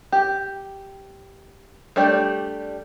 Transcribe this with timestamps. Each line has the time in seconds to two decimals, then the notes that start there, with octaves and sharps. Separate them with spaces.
0.12 G4
1.96 G3 A3 D4 G4 D5